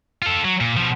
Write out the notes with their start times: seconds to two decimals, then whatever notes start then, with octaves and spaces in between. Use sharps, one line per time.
0.22 F4 A4
0.45 F#3
0.60 A#2
0.77 B2 F3